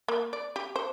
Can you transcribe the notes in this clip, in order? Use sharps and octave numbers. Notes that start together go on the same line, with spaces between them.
A#3
D5
G4
C5